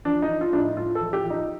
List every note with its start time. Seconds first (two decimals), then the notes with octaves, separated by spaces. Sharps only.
0.05 F3 D4
0.22 D#4
0.29 F3
0.41 F4
0.52 A2 D4
0.59 D#4
0.77 A2 F4
0.95 A4
1.01 F3
1.13 G4
1.24 F3
1.30 D#4